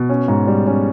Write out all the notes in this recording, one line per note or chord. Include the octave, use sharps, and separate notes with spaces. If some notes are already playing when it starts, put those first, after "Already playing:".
Already playing: B2
C#4
G#2
G3
C#4